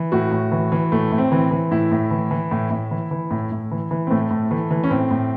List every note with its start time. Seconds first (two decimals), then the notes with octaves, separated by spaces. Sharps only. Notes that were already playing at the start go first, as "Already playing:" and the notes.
Already playing: E3
0.12 A2 F#4
0.32 A2
0.52 E3
0.72 E3
0.92 A2 A3
1.12 A2
1.18 C4
1.32 E3
1.51 E3
1.71 A2 E4
1.92 A2
2.11 E3
2.31 E3
2.51 A2
2.71 A2
2.91 E3
3.11 E3
3.31 A2
3.52 A2
3.71 E3
3.91 E3
4.07 C4
4.11 A2 A3
4.31 A2
4.51 E3 A3
4.71 E3
4.84 C#4
4.91 A2 C4
5.11 A2